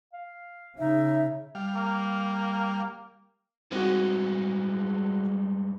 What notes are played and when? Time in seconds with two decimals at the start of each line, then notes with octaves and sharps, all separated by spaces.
0.13 F5
0.79 C#3 D#4 E5
1.55 G3 F5
1.75 A#3
3.72 G2 G#3 C4 F#4